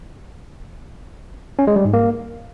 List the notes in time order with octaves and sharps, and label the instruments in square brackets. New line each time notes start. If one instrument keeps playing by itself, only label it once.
[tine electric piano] C#4
G#3
G3
G#2
A#3